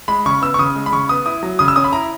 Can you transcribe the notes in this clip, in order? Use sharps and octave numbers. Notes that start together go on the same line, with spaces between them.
G#3 B5
C#3 C#6
B3 E6
C#6
C#3 D#6
G#3
B5
C#3 C#6
B3 D#6
E4 D#6
F#3
C#3 D#6
E6
C#4 D#6
B5
E4 A#5